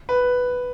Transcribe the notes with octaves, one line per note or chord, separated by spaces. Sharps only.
B4